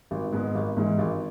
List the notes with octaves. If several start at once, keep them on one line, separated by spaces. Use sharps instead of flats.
G#1
G#2 G#3 B3
G#1
G#2 E3 G#3
G#1